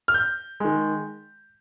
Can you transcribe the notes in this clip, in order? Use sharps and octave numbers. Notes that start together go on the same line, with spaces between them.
F6
G6
D#3 G#3